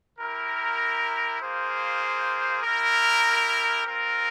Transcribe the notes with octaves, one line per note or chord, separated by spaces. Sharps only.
E4 G4 A#4
A#3 F4 G#4 C5
E4 G4 A#4
C4 F4 A#4